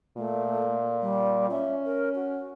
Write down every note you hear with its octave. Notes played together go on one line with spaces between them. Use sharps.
A#2 A3
G3
C#4 E5
A#4
F#4